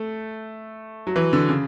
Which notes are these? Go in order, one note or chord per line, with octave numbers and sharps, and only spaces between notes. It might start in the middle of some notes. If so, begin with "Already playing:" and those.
Already playing: A3
F#3
E3
D3
C#3